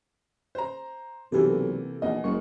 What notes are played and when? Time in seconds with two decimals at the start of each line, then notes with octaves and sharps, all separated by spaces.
0.55 C5 A#5
1.32 B1 C3 E3 A#3 F#4 G4 A4
2.02 A#1 E2 D#5
2.24 F#1 G#3 A#3 C#6